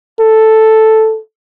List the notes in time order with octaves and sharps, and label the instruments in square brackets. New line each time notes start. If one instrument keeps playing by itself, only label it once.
[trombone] A4